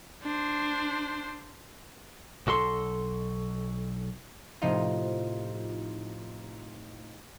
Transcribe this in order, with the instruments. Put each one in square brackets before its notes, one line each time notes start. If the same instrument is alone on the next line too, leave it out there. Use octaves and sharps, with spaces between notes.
[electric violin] D4 C5
[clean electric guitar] B1 F#4 A4 C6
[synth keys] A2 C3 F3 D#4 F4